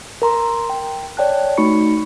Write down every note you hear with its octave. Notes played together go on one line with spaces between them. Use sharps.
A#4 A#5 C6
G5
C#5 D5 G5 A5 F#6
A3 D#4 F#4 B5 C#6 C#7